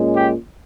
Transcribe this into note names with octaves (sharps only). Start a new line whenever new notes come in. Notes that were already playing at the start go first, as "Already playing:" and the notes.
Already playing: A#2 G#3 C#4
G4